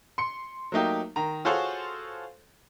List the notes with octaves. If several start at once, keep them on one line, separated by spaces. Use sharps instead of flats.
C6 C#7
F#3 A3 A#3 D#4 G4
D#3 A#5
F4 F#4 G#4 A4 C5 C#5